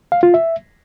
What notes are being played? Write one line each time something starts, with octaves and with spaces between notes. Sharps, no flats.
F5
F4
E5